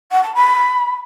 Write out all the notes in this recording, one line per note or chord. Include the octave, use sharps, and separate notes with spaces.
F#5
A5
B5